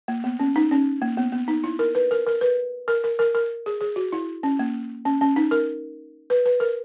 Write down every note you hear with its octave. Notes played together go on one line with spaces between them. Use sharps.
A#3
B3
C#4
D#4
C#4
A#3
B3
B3
D#4
E4
A#4
B4
A#4
A#4
B4
A#4
A#4
A#4
A#4
G#4
G#4
F#4
E4
C#4
A#3
C#4
C#4
D#4
A#4
B4
B4
A#4